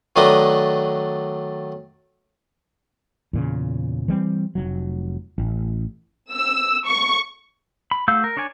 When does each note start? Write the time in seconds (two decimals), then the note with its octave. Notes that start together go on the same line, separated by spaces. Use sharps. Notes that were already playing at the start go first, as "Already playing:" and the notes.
0.16 D#3 F#3 A3 D4 B4 D#5
3.33 E2 A#2 C#3
4.08 E3 G3 C4
4.55 F1 F#3
5.38 A1
6.33 E6
6.87 C#6
7.91 B5
8.08 A3 F#4 F5 E6 G6
8.24 A#4
8.37 D4 C#5 D5 G#5